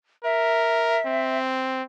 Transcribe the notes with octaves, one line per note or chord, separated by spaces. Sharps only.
A#4 E5
C4